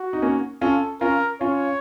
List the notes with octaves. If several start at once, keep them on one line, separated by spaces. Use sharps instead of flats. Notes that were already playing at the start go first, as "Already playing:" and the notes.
Already playing: F#4
D#4
A#3 C#4
C#4 F4 A4
C#4 F4 A#4
C#4 F4 C#5